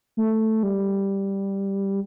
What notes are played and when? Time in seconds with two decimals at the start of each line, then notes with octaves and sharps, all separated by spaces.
0.17 A3
0.63 G3